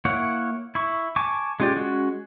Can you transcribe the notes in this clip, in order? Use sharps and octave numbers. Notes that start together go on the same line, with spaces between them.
A#3 E4 C#5 F#5
E4 C#6
G#5 A5 C#6 D6
G#3 C#4 F4 G4 D5
G#3 C#4 F#4